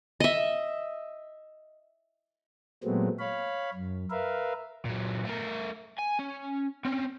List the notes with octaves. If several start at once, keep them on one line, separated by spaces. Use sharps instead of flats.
D#5 E5
A#2 F#3 G#3 A3 B3 C4
C#5 F5 B5
F#2
A#4 B4 E5 F5
A#2 F#3
A3 A#4
G#5
C#4
C4 C#4